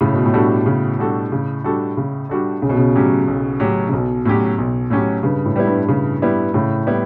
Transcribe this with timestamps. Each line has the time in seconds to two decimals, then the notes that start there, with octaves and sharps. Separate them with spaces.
0.01 A2 C#3
0.13 B2
0.26 A2
0.34 G3 D4 F#4 A4
0.66 C#3
0.99 G3 D4 F#4 A4
1.32 C#3
1.64 G3 D4 F#4 A4
1.97 C#3
2.29 G3 D4 F#4 A4
2.62 B1 C#3
2.69 B2
2.77 C#3
2.95 A2 F#3 C#4 G4
3.28 B1
3.60 A2 F#3 C#4 G4
3.89 C#3
3.93 B1 B2
4.25 A2 F#3 C#4 G4
4.58 B1
4.90 A2 F#3 C#4 G4
5.23 G2 C#3
5.45 A2
5.56 G3 B3 E4
5.67 G2
5.89 C#3
6.22 G3 B3 E4
6.54 A2 C#3
6.87 G3 B3 E4